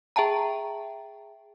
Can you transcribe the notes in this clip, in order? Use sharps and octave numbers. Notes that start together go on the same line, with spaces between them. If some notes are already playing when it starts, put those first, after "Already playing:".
G#4 E5 G5 A5 A#5